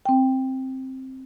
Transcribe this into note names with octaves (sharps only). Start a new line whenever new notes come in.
C4 G5